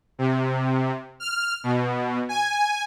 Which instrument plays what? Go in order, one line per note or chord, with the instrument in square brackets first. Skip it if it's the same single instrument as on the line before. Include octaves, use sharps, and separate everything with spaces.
[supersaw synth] C3
F6
B2
G#5